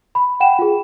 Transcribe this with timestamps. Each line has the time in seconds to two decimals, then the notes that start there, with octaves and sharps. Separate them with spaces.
0.15 B5
0.40 F#5 G5 E7
0.59 F4 G#4